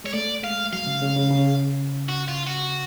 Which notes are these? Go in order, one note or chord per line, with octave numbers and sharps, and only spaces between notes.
G#3 C#5
A3 D5
G#3 F5
F#3 F5
C#3
C#3
C#3
C#3
F#4
F4
F#4